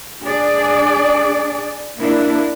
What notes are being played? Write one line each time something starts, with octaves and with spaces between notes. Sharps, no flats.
D4 G#4 D5
A#3 D4 E4